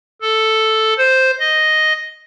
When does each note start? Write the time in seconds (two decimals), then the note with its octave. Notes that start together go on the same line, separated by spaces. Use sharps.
0.21 A4
0.98 C5
1.40 D#5